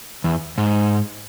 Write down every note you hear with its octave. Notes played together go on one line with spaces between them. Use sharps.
E2
G#2